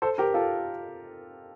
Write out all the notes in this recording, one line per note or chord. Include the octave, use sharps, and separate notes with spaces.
A4 C5
G4 A#4
F4 A4